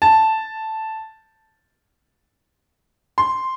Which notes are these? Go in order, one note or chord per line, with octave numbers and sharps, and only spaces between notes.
A5
C6